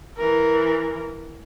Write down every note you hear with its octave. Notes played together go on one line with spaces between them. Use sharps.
E3 A#4